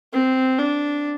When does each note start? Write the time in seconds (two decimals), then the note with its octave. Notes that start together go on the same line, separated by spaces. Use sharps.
0.13 C4
0.58 D4